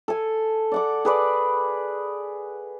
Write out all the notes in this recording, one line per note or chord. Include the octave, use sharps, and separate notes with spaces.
A4 G#5
D5 F#5 D6
G#4 B4 D5